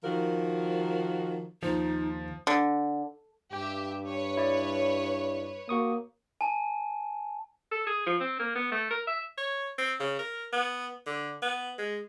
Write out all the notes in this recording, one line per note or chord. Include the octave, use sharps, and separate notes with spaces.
D#3 F3 F#4 A#4
D#2 D#3 F3 D#4 C5
D3
G2 G4 E5 G5
B4 C#5
E4 D5
A#3 F#4 C#6 D#6
G#5 A5
A4
G#4
F3
C4
A#3
B3
A3
A#4
E5
C#5
C4
C#3
A#4
B3
D3
B3
G#3